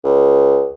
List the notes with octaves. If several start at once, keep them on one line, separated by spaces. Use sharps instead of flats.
C#2